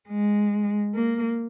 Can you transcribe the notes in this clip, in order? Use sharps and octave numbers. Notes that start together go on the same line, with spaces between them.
G#3
A#3